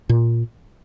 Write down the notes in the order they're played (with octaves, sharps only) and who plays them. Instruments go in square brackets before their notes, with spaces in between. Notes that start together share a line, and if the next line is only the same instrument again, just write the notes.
[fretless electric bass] A#2